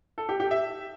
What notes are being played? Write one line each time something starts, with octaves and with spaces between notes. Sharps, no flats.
A4
G4
G4
E5